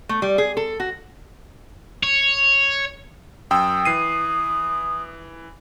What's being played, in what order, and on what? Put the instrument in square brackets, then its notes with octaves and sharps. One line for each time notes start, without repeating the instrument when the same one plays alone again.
[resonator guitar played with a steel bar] A3
G3
G#4
A4
F#4
[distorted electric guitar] C#5
[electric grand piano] F#2 G5 E6 [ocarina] D#6
[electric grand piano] E3 C7 D#7